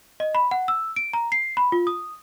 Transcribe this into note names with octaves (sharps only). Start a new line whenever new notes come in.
D#5
B5
F#5
E6
D7
A#5
C7
B5
F4
D#6